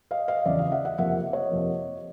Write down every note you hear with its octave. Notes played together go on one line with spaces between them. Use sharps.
D#5 F5
D#5 F5
E2 C#3 F3 D5 E5
D#5 F5
E5 F#5
E5 F#5
F2 C3 F3 A#3 E5 F#5
C#5 D#5
F2 C3 F3 A#3